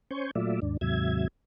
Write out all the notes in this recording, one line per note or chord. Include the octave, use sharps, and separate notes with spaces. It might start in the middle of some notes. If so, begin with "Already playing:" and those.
C#4 C5 G#5 C#6 G6
A#2 F#3 A3 F4 D5 E5
D#2 G#2 D4
D#2 G#2 C3 F#3 E5 G#6